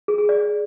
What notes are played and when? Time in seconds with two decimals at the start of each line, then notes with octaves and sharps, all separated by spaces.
0.08 G#4
0.18 G#4
0.29 D5